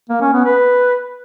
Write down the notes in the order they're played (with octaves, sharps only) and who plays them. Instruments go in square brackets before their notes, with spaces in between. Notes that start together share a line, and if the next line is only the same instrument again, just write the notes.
[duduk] A#3
C#4
B3
B4